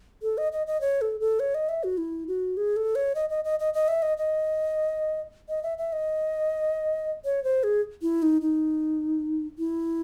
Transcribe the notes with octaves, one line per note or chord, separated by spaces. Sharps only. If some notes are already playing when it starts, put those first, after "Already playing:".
A4
D#5
D#5
D#5
C#5
A4
A4
C#5
D#5
E5
F#4
E4
F#4
G#4
A4
C#5
D#5
D#5
D#5
D#5
D#5
E5
D#5
D#5
D#5
E5
E5
D#5
C#5
C5
G#4
E4
D#4
D#4
E4